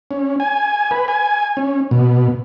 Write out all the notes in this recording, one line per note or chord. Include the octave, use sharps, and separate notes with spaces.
C#4
G#5
B4
G#5
C#4
B2